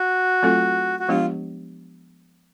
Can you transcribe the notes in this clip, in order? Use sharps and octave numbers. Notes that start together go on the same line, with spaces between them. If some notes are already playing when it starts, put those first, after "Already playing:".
Already playing: F#4
F#3 A3 C4 F4 A4
F#4
F3 G#3 B3 D4 F4 G4